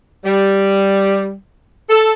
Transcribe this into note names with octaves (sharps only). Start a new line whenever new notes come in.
G3
A4